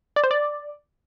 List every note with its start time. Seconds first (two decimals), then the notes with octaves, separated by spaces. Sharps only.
0.16 D5
0.24 C5
0.31 D5